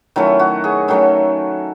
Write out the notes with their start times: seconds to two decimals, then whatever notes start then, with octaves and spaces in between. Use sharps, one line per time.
0.16 D#3 F#3 A3 C#4 E4
0.39 F#4
0.64 G#4
0.88 D#3 F#3 A3 C#4 A4